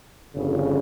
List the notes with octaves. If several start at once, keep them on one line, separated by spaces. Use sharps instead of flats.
G1 F2 C#3